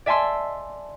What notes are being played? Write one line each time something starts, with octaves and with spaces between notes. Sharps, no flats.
D5 E5 G#5 A5 C6 E6